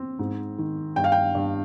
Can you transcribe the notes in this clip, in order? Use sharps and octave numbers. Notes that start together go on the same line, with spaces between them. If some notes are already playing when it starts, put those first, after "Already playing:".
Already playing: C4
G#2
D#3
G2 G5
F5
G5
G2